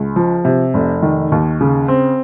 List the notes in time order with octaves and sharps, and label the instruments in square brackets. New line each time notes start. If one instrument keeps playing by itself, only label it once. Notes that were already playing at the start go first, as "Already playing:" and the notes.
Already playing: [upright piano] C#2
F3
C3
F1
D#3
D#2
C#3
C4